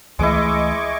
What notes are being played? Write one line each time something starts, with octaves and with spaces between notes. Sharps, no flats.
C#2 E3 G#3 A3 E4 D#5 C#6 D6